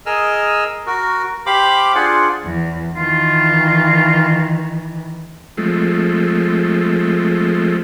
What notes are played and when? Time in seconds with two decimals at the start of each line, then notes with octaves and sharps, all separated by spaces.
0.06 G#4 A#4 D#5 E6 F6
0.87 F#4 A#4
1.46 G4 C5 F5 B5 D6
1.95 D4 F4 G#4 C5 D5 F#5
2.45 E2
2.96 D#3 E3 F4
5.57 F3 G#3 A3 C4